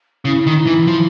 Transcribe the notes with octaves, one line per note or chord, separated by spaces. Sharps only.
C#3 E4
D#3 D#4
E4
E3
F3